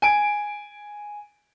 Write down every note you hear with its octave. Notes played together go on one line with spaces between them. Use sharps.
G#5 D7